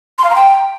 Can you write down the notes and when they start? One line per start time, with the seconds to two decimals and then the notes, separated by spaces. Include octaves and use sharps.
0.18 C6
0.24 F5
0.30 A#5
0.36 G5